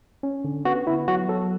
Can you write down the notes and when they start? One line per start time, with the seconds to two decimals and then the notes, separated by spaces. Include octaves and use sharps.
0.23 C#4
0.44 D3
0.65 B3 F#4
0.87 B3 E4
1.08 F#3 F#4
1.29 F#3 A4